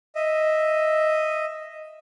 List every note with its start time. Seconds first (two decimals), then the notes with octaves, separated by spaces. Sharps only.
0.15 D#5 E5